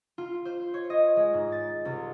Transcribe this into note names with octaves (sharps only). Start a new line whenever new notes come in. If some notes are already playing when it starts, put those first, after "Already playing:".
F4
C5
C#5
D#5
G#3
G#2
A6
C2